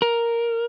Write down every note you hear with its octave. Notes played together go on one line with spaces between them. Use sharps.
A#4